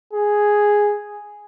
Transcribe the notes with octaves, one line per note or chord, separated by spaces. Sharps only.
G#4